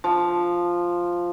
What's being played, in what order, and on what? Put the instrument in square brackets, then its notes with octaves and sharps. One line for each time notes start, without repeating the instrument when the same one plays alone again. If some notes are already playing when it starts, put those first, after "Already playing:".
[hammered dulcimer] F3